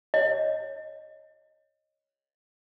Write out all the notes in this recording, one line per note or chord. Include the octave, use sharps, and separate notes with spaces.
C#5 D#5